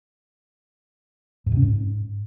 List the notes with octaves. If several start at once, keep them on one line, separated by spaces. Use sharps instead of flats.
G#2
C3
C#4
G#2